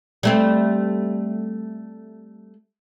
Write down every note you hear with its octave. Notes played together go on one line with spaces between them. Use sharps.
G3 A3 C4